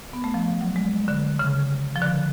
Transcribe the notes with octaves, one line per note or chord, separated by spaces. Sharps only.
B3
A3
F3
F#3
G#3
D3
C#3
F3
D3